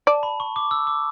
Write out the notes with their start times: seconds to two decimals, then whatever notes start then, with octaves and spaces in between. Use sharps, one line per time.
0.07 D5 A5
0.23 B5
0.40 C#6
0.56 D6
0.71 E6
0.87 D6